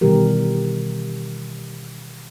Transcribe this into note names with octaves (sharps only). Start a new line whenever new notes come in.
B2 D#3 E3 G3 G4 A#4